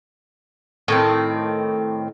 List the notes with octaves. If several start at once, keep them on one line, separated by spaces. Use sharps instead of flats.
A2 D#3 C4